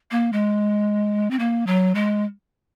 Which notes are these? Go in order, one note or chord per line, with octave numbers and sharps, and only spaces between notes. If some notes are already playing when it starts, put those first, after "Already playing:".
A#3
G#3
C4
A#3
F#3
G#3